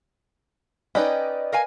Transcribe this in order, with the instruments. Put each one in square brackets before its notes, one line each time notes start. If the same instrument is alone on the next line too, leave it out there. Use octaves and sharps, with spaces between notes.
[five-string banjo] C#4 D#4 [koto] B4 G5 [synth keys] D5 D#5
[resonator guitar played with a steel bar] A#4 F5 G#5